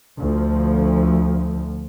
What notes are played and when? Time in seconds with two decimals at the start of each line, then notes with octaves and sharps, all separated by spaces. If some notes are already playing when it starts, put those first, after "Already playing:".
0.19 D2 F3